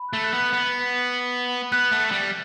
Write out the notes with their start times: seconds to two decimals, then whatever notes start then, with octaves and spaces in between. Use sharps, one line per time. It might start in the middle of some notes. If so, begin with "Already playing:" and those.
Already playing: B5
0.09 A3 F#6
0.23 F#6
0.33 B3
0.38 F#6
0.53 B3
1.72 B3 F#6
1.91 A3
2.12 G3